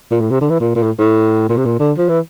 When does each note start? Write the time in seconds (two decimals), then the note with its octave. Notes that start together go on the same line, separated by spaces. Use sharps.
0.11 A#2
0.21 A2
0.31 C3
0.41 D3
0.50 E3
0.60 A#2
0.75 A#2
0.83 A2
0.99 A2
1.49 A#2
1.57 C3
1.65 A#2
1.79 D3
1.98 F3
2.09 E3